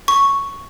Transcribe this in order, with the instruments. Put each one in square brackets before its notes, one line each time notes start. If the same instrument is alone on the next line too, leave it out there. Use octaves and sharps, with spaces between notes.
[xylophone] C#6